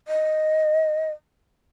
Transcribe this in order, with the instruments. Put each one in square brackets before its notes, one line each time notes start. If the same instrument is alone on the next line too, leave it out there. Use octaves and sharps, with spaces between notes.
[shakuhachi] D#5